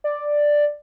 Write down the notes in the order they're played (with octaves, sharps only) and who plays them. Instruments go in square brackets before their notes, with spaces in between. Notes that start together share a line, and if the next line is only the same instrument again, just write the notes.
[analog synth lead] D5